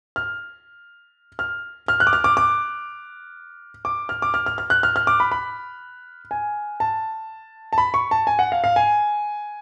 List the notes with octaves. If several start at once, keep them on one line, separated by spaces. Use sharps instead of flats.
F6
F6
F6
F#6
D6
F6
D6
D6
D6
F6
D6
F6
F6
F6
F#6
F6
F6
D6
B5
B5
G#5
A5
A5
B5
C#6
A5
G#5
F#5
F5
F5
G#5